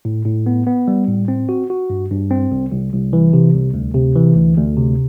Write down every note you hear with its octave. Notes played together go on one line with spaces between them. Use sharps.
A2
A2
B3
B3
G3
A2
C4
F#4
F#4
G2
G2
C4
C2
C2
C2
E3
C3
C2
D2
C3
E3
D2
D2
C3